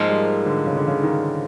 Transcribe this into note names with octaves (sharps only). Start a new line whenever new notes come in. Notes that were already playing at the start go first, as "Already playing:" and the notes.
Already playing: G#2 F3 G#3 A#3
G3
D3
C#3
D3
C#3
D#3